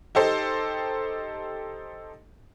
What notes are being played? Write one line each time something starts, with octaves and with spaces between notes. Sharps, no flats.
D#4 G4 A4 C5